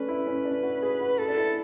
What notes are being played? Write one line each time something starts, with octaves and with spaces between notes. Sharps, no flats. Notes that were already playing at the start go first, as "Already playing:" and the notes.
Already playing: A3 C#4 D4 B4
E4
C#4
D4
F#4
G#4
F#4
E4 A4
D4
E4